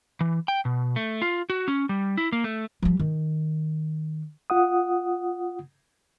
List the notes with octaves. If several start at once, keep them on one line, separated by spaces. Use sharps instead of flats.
E3
G5
B2
A3
F4
F#4
C#4
G3
E4
A#3
A3
F3 G3
D#3
F4 F#5 D#6